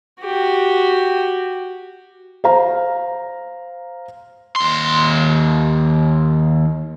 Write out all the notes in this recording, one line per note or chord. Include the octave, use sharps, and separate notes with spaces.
F#4 G4
C5 F5 A#5
D#2 C6